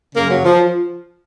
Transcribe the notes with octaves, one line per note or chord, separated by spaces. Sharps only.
F#2 C#3 A#3
F#3
F3